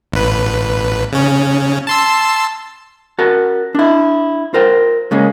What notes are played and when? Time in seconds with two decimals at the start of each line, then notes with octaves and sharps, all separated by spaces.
0.12 A1 B4
1.13 C#3 C#4
1.87 A5 C6 E6
3.19 F#4 A#4 F#5 A5
3.75 D4 E4
4.54 F4 A#4 C5 G5
5.11 C#3 G#3 A#3 C#4